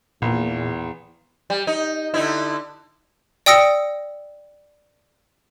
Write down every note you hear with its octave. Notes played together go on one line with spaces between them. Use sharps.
A#1 E2 A#2
G3
D#4
D3 D#4 E4
D5 G5 D#6 E6 A#6 C#7